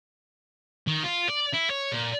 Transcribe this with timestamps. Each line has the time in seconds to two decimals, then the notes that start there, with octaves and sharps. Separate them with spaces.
0.87 D#3
1.03 F4
1.29 D5
1.53 E4
1.70 C#5
1.92 A#2